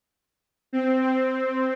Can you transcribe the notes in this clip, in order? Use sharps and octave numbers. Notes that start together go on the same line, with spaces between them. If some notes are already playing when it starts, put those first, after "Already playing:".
C4
C4